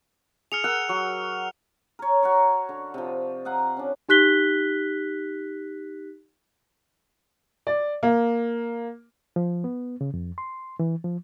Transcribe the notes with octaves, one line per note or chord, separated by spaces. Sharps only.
G#4 F6 C#7 F7
A#4 F#5 E6
F#3
A#4 C#5
F#4 A#4 C#5
D3
C3 F3
D#5 F5 F#5 A#5
C#4 D4
D#4 G4 F#6 B6 G7
D5
A#3
F3
B3
C#3
F2
C6
E3
F3